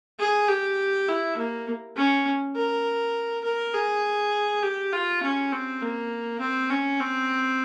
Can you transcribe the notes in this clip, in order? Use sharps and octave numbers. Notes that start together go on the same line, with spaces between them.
G#4
G4
E4
A#3
C#4
A#4
A#4
G#4
G4
F4
C#4
C4
A#3
C4
C#4
C4